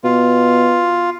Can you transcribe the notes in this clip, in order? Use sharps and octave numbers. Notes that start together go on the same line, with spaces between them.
B2 F4